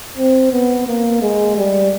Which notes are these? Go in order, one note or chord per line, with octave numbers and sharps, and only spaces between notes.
C4
B3
A#3
G#3
G3